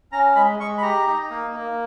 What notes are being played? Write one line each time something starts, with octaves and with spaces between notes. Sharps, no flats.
C#4 A#5
G#3 B5
G#3 C#6
B5
G4 A#5
D#4
A#3
A#3